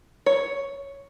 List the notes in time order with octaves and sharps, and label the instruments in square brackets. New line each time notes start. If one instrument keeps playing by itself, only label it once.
[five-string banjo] C#5